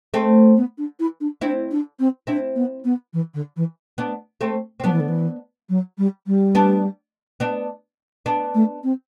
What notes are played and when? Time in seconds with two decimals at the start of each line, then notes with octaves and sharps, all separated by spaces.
0.14 A3 C4
0.56 B3
0.78 D4
0.99 E4
1.20 D4
1.41 C4 D4 E4
1.71 D4
1.99 C4
2.27 C4 D4 E4
2.55 B3
2.84 B3
3.13 E3
3.34 D3
3.56 E3
3.98 B3 D4
4.41 A3 C4
4.80 C4
4.84 F#3 B3 D4
4.91 E3
5.00 D3
5.08 E3
5.69 F#3
5.98 G3
6.27 G3
6.55 B3 D4
7.40 B3 D4
8.26 B3 D4
8.54 A3
8.83 C4